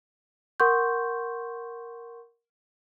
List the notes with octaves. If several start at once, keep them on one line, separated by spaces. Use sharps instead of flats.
A#4 F#5 C6 C#6 G6